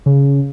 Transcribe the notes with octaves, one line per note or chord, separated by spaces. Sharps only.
C#3